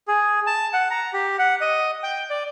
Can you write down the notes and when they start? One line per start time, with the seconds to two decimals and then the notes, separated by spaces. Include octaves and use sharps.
0.08 G#4
0.47 A5
0.73 F#5
0.90 A#5
1.13 G4
1.39 F#5
1.61 D#5
2.03 G5
2.30 D5